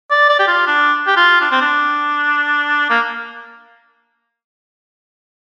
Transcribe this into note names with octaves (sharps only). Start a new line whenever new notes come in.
D5
D5
G4
F4
D4
G4
F4
D4
C4
D4
A#3